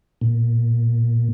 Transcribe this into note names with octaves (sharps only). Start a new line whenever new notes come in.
A#2